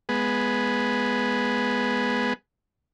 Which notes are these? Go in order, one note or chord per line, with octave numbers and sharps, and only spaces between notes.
G#3 B3